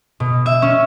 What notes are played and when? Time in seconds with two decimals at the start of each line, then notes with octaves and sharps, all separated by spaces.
0.20 B2
0.46 E5
0.62 C#4